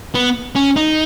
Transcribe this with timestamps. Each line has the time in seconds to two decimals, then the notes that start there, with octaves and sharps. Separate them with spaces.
0.15 B3
0.55 C#4
0.76 D#4